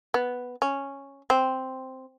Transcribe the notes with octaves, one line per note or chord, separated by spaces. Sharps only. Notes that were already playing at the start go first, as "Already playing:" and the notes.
B3
C#4
C4